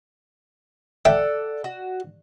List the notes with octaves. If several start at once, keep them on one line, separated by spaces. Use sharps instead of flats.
A4 D5 E5 F#5 G5
F#4